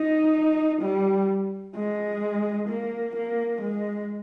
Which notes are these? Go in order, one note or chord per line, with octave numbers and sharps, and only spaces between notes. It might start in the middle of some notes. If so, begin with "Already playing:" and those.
Already playing: D#4
G3
G#3
A#3
A#3
G#3